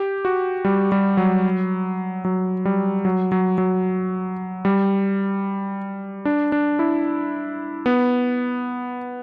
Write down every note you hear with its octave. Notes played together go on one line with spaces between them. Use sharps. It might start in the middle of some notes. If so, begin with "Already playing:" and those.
Already playing: G4
F#4
G3
G3
F#3
F#3
G3
F#3
F#3
F#3
G3
D4
D4
E4
B3